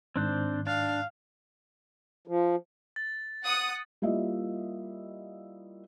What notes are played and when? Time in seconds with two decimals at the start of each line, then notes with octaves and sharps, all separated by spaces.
0.16 G#2 D#3 C4 D4 C5
0.67 D4 F5
2.28 F3
2.96 A6
3.42 F#5 D#6
4.02 G3 A#3 E4 F4 D#5 E5